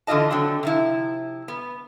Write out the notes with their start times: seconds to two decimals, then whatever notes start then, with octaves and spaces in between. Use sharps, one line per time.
0.07 D3 E3 F4 D#5 A5
0.31 D3 F#3 C4
0.63 C3 F3 E4
1.48 B3